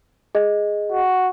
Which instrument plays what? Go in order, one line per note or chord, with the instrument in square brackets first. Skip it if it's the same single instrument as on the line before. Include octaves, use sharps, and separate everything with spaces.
[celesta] G#4 D#5
[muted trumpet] F#4